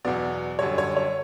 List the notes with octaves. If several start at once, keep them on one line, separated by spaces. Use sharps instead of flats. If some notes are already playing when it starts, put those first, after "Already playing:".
E2 B2 F#3 B3 D5
F#2 D3 G3 C#5
C#5
C#5